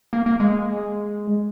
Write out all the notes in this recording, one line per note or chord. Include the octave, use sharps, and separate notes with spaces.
A#3
A#3
G#3